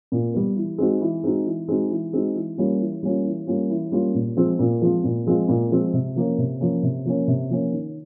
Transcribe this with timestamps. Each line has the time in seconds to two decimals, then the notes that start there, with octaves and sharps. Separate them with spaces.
0.12 A#2
0.34 G3 B3
0.56 E3
0.78 G#3 C4 D#4 F#4
1.01 E3
1.23 G#3 C4 D#4 F#4
1.46 E3
1.68 G#3 C4 D#4 F#4
1.91 E3
2.13 G#3 C4 D#4 F#4
2.35 E3
2.58 G3 A#3 C#4 F4
2.80 E3
3.03 G3 A#3 C#4 F4
3.25 E3
3.47 G3 A#3 C#4 F4
3.70 E3
3.92 G3 A#3 C#4 F4
4.14 A#2
4.37 F3 G#3 C4 F4
4.59 A#2
4.82 F3 G#3 C4 F4
5.04 A#2
5.26 F3 G#3 C4 F4
5.49 A#2
5.71 F3 G#3 C4 F4
5.93 C3
6.16 F3 A#3 C#4
6.38 C3
6.60 F3 A#3 C#4
6.83 C3
7.05 F3 A#3 C#4
7.28 C3
7.50 F3 A#3 C#4
7.73 D#3